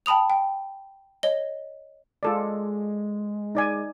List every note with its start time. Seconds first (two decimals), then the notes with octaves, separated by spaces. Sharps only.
0.06 G5 A5 B5 D#6 F7
0.30 G5
1.23 C#5 D#5 G7
2.23 G#3 F4 A4 D5
3.55 D#4 D5 G#5